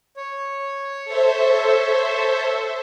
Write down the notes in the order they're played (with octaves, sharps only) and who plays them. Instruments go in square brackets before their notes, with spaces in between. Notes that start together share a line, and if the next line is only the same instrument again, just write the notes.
[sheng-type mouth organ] C#5
[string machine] A4 C5 E5